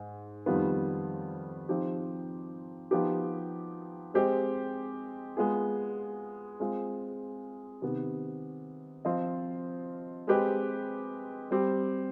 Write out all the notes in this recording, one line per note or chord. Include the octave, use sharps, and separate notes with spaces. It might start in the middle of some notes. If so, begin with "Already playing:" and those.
Already playing: G#2
F2 D#3 G3 B3 F4
F3 C4 D#4 G4
F3 B3 D#4 G4
G#3 C4 G4 C5 D#5
G#3 B3 F4 G#4
G#3 C4 F4
C3 D#3 B3
F3 C4 F4 C5 D#5
G#3 C4 G4 B4 D#5
G3 C4 G4